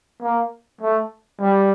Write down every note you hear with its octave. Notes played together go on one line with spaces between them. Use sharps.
A#3
A3
G3